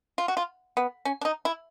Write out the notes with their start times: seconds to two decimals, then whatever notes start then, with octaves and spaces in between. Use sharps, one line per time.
0.18 F4
0.28 F#4
0.37 F4
0.77 B3
1.05 C#4
1.21 D4
1.25 D#4
1.45 E4